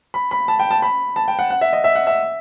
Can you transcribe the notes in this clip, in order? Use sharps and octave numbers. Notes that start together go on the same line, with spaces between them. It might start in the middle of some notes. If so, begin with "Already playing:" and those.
B5
B5
A5
G5
A5
B5
A5
G5
F#5
F#5
E5
D#5
E5
F#5
E5